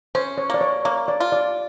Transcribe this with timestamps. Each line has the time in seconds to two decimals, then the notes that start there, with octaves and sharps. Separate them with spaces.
0.15 C#4 C5
0.38 C#5
0.50 A#3 D5
0.61 C#5
0.85 A#3 C#5
1.08 D5
1.20 F4
1.32 D5